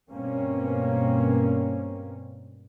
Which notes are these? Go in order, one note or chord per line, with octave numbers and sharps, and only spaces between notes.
G2 B2 A#3 C4 C#4